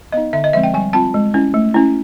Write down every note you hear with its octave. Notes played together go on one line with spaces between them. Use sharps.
B3 D#4 D#5
D3 E5
D#5
F3 G#3 C4 E5
G5
G3 G#5
C4 F4 A5
G#3
C#4 E4
A3
C#4 E4